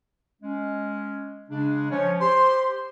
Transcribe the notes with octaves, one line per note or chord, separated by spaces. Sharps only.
G#3 C#4
C#3 G#3 D4
F3 C#4 C#5
G4 C5 C6